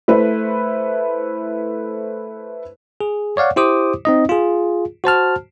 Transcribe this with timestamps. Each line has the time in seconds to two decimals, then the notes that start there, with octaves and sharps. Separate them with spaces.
0.08 A3 E4 B4 C5 E5
3.01 G#4
3.37 C#5 D5 F5 F#5
3.56 E4 G4 C5 D6 D#6
4.05 C4 D#4 D#5
4.29 F4 G#4
5.04 F#4 C5 A5 F6